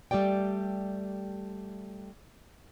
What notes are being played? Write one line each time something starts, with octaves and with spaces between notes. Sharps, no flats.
G3 A3 G4 D5 G5